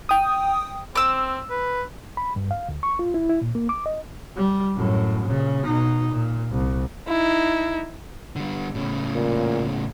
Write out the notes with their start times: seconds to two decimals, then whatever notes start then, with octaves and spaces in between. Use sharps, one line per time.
0.09 G5 D#6
0.95 C4 D6 E6
1.50 B4
2.17 B5
2.36 G2
2.51 F5
2.69 D2
2.83 C#6
2.99 F4
3.14 E4
3.29 E4
3.41 A#2
3.55 A#3
3.69 D6
3.86 D#5
4.36 G3
4.76 F#2 A2
5.24 A#2 C#3
5.63 B2 D#4
6.11 A#2
6.52 C2
7.08 D#4 E4
8.36 D3 G3
8.75 A2 C#3
9.16 A#2